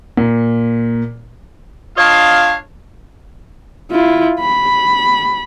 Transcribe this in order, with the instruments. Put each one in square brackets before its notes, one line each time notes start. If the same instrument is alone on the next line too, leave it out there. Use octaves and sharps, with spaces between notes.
[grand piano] A#2
[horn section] D4 F4 C#5 D#5 F5
[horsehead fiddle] E4 F4
B5